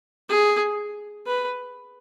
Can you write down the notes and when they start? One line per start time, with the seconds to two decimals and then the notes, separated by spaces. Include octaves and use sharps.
0.29 G#4
1.27 B4